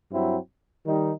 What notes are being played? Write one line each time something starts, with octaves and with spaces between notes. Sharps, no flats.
G2 F#3 C4 E4
D#3 G3 D#4